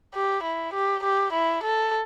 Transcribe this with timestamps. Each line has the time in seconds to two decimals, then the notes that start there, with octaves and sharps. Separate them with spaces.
0.15 G4
0.43 E4
0.74 G4
1.04 G4
1.33 E4
1.63 A4